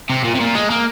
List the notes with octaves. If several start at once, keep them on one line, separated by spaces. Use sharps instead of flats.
C3
A#2
C3
A#2
G#3
A#3